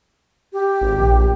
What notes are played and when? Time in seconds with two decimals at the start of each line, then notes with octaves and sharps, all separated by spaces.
0.53 G4
0.81 G#1
0.98 A#1